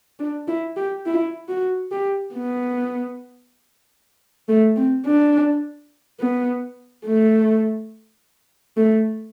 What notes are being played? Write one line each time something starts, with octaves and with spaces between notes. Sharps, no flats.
D4
E4
G4
E4
F#4
G4
B3
A3
C4
D4
B3
A3
A3